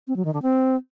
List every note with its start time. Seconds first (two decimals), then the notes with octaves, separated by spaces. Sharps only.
0.08 C4
0.16 F#3
0.25 D#3
0.34 D3
0.42 C4